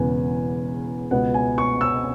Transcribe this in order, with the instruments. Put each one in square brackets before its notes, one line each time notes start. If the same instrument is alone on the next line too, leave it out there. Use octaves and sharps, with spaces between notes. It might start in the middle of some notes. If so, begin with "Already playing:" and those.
Already playing: [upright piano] E1 E2 C#3 E3 B3 G#5
C#2 B2 B3 F#5
G#5
C#6
E6